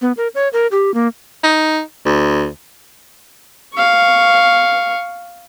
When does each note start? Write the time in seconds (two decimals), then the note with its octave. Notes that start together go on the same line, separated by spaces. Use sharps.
0.02 B3
0.17 A#4
0.35 C#5
0.53 A#4
0.72 G4
0.94 A#3
1.43 D#4
2.05 D2
3.74 F5 C#6